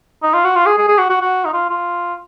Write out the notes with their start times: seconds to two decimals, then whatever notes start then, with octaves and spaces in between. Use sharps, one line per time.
0.23 D#4
0.34 F4
0.44 F#4
0.56 F4
0.66 G#4
0.78 G#4
0.88 G#4
0.99 F#4
1.10 F#4
1.21 F#4
1.45 D#4
1.54 F4
1.70 F4